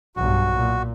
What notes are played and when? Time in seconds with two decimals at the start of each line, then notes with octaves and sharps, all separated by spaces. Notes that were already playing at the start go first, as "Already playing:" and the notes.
0.16 B1 G2 F#4
0.57 A#2